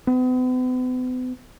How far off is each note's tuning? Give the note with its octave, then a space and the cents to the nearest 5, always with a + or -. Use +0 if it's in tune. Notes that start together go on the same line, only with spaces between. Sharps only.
B3 +40